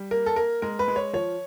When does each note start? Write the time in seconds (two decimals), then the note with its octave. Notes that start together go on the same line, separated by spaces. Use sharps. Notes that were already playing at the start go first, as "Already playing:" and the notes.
Already playing: G3
0.11 A#3 A#4
0.26 A4
0.36 A#3 A#4
0.62 G#3 A#4
0.79 B4
0.88 G#3
0.96 C#5
1.13 F3 C#5